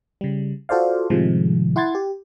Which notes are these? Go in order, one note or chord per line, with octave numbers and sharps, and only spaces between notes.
C#3 G3
F4 F#4 A4 C5 D5 F5
A2 C3 D#3 F3 G#3
E4 F#5 C6 G#6 A6
G4